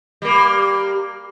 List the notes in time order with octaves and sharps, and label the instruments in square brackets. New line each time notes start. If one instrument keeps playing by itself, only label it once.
[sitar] G3 A#3